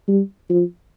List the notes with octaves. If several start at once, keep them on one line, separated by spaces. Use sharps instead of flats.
G3
F3